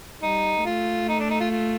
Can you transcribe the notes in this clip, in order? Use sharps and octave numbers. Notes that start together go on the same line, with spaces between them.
G3 D#4
A3 F4
D#4
D4
D#4
F4
F4